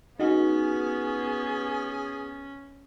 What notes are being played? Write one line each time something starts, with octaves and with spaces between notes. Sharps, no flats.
B3 C#4 D#4 F#4 G#4